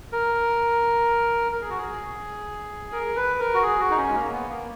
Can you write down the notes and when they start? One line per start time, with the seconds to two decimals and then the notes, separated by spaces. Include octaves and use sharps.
0.12 A#4
1.52 A#4
1.61 G#4
1.70 F#4
1.78 G#4
2.92 A#4
3.16 B4
3.39 A#4
3.54 F#4
3.62 G#4
3.80 F#4
3.91 D#4
3.97 C#4
4.08 G#3
4.14 A#3
4.32 B3
4.50 A#3